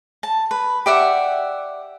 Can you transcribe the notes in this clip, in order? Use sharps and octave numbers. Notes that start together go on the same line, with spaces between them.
A5
B4
G4 D5 E5 F#5